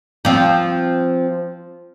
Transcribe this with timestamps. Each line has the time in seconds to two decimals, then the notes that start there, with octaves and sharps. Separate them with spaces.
0.25 F3 C4